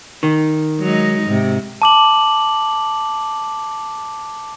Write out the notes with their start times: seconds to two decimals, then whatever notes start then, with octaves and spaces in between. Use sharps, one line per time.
0.23 D#3
0.80 F#3 G#3 D#4
1.27 G#2 C3
1.82 A5 D6 F#7